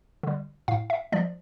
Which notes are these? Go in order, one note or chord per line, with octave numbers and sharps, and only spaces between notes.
D3 G3
A2 F5
E5
F3 G#3 D5